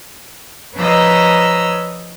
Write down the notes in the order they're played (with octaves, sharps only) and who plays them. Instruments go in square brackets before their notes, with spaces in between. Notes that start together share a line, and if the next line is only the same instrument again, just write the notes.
[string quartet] F3 B4 C#5 D#5 A#5 E6